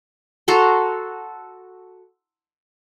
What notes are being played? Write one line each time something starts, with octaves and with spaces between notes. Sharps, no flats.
F#4 A4 A#5 C6